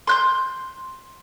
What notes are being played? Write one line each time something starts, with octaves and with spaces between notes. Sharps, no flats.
C6 F#6 G6